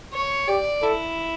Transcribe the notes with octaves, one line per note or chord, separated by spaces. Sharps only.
C#5
G4 D5
E4 A4